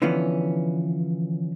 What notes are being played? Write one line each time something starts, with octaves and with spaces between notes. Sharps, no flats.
D3 E3 F3 B3 C#4